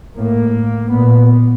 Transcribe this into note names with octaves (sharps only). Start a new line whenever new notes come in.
A2 A#3
A#2 B3